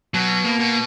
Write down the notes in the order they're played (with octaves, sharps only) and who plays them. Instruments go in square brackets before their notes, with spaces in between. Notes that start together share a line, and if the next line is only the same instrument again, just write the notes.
[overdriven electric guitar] B2 [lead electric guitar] F#3
[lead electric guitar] A#3
[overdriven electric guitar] B2